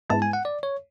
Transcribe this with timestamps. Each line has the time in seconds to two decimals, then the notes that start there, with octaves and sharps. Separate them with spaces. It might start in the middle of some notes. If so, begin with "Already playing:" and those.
0.10 G#2 G#3 B3 E4 A5
0.22 G#5
0.33 F#5
0.45 D5
0.63 C#5